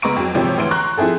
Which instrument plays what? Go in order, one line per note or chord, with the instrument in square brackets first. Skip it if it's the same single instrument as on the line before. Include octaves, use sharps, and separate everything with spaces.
[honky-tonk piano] C#2 B3 A#5 C#6 D7
F2 F#3
G#1 C3 F3 G4 C#5
D2 E3 C6 D7
A#5 C6 C#6 F#6
F3 C4 E4 G#4 A4